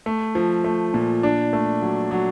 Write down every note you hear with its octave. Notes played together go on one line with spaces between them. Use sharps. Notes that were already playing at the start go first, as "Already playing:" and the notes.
A3
F3
A3
A#2
D4
A3
F#3
F#3